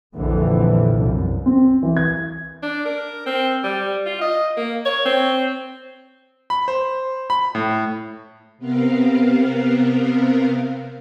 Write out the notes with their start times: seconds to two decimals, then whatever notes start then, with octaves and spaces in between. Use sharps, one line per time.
0.13 A#1 F2 D3 E3 F3
0.96 C2 F#2
1.46 C4
1.83 E3
1.97 G#6
2.63 D4
2.85 A#4
3.26 C4
3.64 G3
4.06 F4
4.21 D#5
4.57 A#3
4.86 C#5
5.05 C4
6.50 B5
6.68 C5
7.30 B5
7.55 A2
8.58 C3 B3 C4 A#4 F5